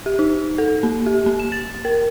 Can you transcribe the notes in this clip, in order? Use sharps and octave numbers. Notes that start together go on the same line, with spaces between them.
G4
D#4
A4
A#3
G4
A#3
E7
A6
A#4